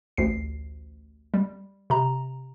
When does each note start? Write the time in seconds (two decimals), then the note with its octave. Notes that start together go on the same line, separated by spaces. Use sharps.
0.17 A1 D2 C7
1.34 G3
1.90 C3 A#5